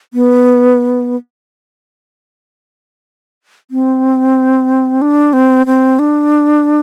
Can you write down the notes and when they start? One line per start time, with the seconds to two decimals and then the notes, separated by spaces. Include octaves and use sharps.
0.14 B3
3.71 C4
5.02 D4
5.33 C4
5.66 C4
5.99 D4